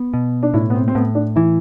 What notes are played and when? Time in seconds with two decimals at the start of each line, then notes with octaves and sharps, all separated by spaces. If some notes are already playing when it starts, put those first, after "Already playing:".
Already playing: B3
0.14 B2
0.43 D4
0.54 A2 E4
0.70 B3
0.74 C4
0.88 C4
0.95 A2 B3
1.15 D4
1.36 E3 E4